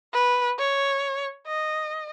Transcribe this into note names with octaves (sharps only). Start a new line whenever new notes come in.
B4
C#5
D#5